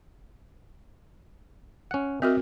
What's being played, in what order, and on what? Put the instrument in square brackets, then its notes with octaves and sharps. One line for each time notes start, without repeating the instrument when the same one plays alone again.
[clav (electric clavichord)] C#4 F#5
[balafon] C4 F#4 A#4 [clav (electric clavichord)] D#5 E5